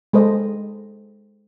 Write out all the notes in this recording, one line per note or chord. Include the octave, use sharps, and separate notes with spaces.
G#3 A4 C5 D#5